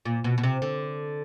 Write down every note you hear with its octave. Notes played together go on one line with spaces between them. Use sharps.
A#2
B2
B2
C3
D3